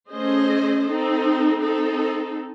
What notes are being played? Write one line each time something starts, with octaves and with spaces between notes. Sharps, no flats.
A3 C#4 G#4 C5 D#5
C4 D#4 A4
C4 D#4 A4